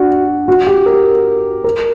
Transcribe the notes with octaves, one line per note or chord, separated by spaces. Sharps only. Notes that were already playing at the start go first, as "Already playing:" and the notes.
Already playing: D4 F#4
F#4
G4
A#4
A#4